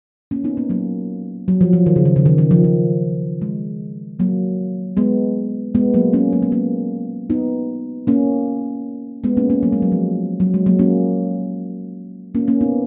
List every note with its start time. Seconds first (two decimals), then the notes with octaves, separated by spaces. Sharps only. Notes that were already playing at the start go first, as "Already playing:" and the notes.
0.31 A#3 C#4
0.44 B3 D#4
0.57 A#3 C#4
0.69 F#3 A#3
1.48 F#3
1.61 F3
1.73 F3
1.86 D#3
1.96 C#3
2.05 D#3
2.16 C#3
2.25 D#3
2.38 D#3
2.51 F3
2.64 F3
3.42 G#3
4.19 F#3 A#3
4.97 G#3 B3
5.75 G#3 B3
5.94 F#3 A#3
6.13 A#3 C#4
6.33 F#3 A#3
6.42 G#3 B3
6.52 A#3 C#4
7.30 B3 D#4
8.07 A#3 C#4
9.24 G#3 B3
9.37 A#3 C#4
9.50 A#3 C#4
9.63 F#3 A#3
9.72 G#3
9.82 F#3
9.92 F3
10.40 F#3
10.54 G#3
10.66 F#3 A#3
10.79 A#3 C#4
12.35 A#3 C#4
12.48 A#3 C#4
12.61 B3 D#4